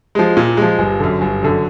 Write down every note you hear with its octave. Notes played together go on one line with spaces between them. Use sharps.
F3 G#3
A#2
F3 G#3
G1
F#2 D3
G1
F#2 D3